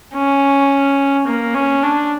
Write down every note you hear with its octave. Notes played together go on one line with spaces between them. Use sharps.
C#4
A#3
C#4
D4